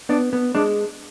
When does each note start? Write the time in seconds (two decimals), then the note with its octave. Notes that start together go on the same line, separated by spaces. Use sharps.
0.09 B3 D4
0.33 B3
0.55 G#3 D4